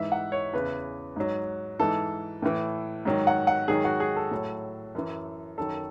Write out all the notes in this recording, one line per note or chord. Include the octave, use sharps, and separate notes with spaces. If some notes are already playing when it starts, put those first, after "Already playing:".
Already playing: G#2 E3 E5
F#5
C#5
E2 C#3 E3 B4
G#2 F#3
G#2 E3 A4
A2 E3
G#2 D#3 F#3
F#5
F#5
G#2 D#3 F#3 G#4
F#4
G#4
A4
A2 F#3
F#2 E3
F#2 D#3 F#3 A4